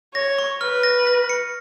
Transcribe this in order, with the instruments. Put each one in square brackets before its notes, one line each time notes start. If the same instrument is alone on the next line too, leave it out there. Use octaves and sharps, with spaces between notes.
[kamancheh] C#5 [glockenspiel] A#6
[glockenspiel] C#6
[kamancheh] B4 [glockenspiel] F6
[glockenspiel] A#6
A#6
C#7